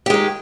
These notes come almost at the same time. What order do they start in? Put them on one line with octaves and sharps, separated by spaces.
G4 G#3 D#3